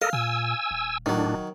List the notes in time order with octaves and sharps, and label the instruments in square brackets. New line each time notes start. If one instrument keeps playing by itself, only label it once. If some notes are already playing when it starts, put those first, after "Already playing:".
[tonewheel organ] A4 A#4 D#5 [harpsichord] F5
[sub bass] A#2 [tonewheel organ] G#5 E6
[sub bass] D#1
[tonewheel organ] A2 D4 [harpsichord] D#3 F#3